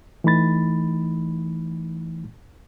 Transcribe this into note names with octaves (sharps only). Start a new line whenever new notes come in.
E3 A3 D#4 B5 A6